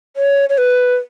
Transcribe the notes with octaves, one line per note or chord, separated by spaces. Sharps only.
C#5
C#5
B4